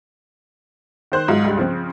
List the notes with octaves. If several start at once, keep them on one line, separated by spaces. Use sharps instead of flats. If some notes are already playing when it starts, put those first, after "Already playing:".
D#3 C5 F#6
G#2 F#3 F4
C#2 G2
C#3 F3 C4